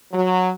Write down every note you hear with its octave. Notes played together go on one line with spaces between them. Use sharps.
F#3